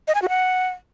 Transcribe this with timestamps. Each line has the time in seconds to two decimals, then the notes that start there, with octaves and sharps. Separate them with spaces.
0.08 D#5
0.15 G#5
0.22 F#4
0.29 F#5